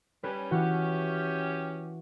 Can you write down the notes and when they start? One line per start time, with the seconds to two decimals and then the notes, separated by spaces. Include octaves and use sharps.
0.23 G3 C#4 B4
0.51 E3 C#4 F#4 G4